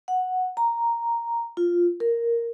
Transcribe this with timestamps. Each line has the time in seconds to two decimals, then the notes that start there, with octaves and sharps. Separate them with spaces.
0.08 F#5
0.57 A#5
1.57 F4
2.00 A#4